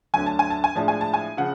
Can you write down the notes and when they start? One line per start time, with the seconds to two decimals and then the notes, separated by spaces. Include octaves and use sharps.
0.14 D2 D3 F#3 G#5
0.26 A5
0.39 G#5
0.50 A5
0.64 G#5
0.75 A2 F3 G#3 D4 A5
0.88 G#5
1.01 A5
1.14 G#5
1.37 C#3 F3 F#5